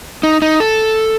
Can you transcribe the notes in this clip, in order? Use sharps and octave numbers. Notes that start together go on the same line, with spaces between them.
D#4
D#4
A4